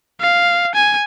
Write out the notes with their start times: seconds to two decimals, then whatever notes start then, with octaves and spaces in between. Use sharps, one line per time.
0.21 F5
0.75 G#5